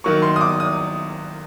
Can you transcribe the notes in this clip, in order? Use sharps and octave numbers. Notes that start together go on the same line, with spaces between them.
D#3 F#3 A#3 C#6
C6
D#6
D6
D#6